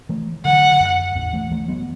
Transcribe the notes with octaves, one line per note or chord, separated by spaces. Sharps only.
E3 A3
D3 F#3 F#5
F#2
E2 A2
E3 A3
E3 A3
F#3 B3